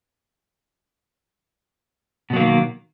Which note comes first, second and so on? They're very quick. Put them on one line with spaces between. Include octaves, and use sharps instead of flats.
B2 F#3 A#3 D#3